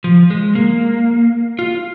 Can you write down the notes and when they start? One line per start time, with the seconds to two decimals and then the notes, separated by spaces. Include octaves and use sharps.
0.04 F3
0.30 G#3
0.55 A#3
1.59 F4